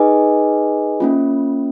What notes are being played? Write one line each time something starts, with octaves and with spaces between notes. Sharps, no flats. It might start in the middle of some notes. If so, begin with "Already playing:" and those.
Already playing: D#4 G#4 B4 D#5 G#5
A#3 C#4 F4